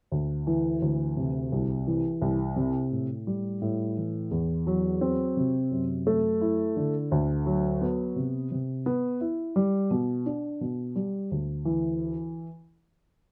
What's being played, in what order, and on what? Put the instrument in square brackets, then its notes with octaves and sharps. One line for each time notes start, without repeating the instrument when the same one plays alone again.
[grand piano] D2
E3
D2
C3
C2
E3
C2
C3
A2
G3
A2
E3
E2
F#3
C4
C3
F#2
A3
E4
D3
D2
F#3
B3
C3
C3
B3
E4
G3
B2
D4
B2
G3
D2
E3